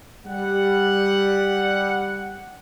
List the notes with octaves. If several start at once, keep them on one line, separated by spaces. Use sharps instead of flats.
G3 F#5